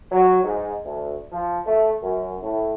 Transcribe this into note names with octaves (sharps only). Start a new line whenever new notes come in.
F#3
G#2
D2
F3
A3
F#2
A2